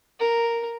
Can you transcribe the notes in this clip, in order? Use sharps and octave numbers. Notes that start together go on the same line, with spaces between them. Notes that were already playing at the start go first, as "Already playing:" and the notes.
A#4